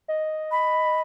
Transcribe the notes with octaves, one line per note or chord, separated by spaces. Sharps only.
D#5
B5